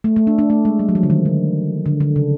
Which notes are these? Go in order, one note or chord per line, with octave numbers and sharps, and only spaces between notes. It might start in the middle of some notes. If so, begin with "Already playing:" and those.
A3
A3
D4
D4
A3
G#3
G3
F#3
F3
D3
D#3
D3
D3
D3
C#3